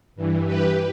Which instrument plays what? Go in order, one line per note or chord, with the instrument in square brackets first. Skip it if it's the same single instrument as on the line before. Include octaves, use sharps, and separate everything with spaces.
[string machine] G2 E3
G4 B4